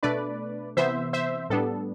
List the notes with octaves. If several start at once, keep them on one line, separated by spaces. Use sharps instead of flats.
B2 A3 D4 B4 D5
C3 E3 B3 C5 E5
C5 E5
A2 G3 B3 D4 A4